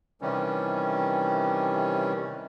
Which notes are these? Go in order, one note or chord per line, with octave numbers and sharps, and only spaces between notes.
C3 D#3 E3 G3 C#4